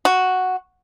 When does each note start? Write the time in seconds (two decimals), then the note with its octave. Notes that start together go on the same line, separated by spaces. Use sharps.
0.05 F#4